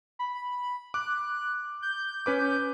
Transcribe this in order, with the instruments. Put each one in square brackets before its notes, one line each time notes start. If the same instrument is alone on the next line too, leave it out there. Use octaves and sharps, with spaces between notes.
[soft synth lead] B5
[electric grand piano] D6 [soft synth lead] F#6
[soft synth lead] G6
[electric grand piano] C#4 B4 D6